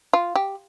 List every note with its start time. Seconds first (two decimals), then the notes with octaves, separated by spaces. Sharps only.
0.13 F4
0.35 G4